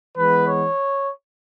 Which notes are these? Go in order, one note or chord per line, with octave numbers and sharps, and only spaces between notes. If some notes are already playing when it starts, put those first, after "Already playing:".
E3 G#3 B3 B4
C#5